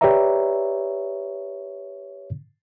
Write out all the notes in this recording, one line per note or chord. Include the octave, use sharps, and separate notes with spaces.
G4 B4 C#5 D5 E5 A#5